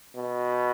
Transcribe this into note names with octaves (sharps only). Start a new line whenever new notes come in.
B2